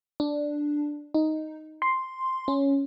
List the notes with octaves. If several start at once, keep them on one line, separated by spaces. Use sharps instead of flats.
D4
D#4
C6
C#4